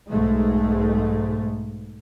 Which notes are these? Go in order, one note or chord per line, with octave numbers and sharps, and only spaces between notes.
B1 G#2 G#3 A3